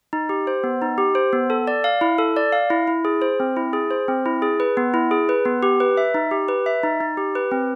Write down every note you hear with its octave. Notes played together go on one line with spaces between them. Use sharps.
D#4
G4
C5
B3
D#4
G4
C5
B3
A4
D5
F5
E4
A4
D5
F5
E4
E4
G#4
C5
C4
E4
G#4
C5
C4
E4
G#4
B4
B3
E4
G#4
B4
B3
G4
B4
E5
D#4
G4
B4
E5
D#4
D#4
G4
B4
C4